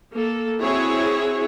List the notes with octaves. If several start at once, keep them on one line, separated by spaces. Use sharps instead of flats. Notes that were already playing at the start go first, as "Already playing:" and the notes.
A#3 A4
C4 E4 F#4 G#4 C#5